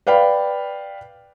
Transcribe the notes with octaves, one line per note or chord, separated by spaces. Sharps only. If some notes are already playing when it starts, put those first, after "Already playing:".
B4 D5 F5 G5 B5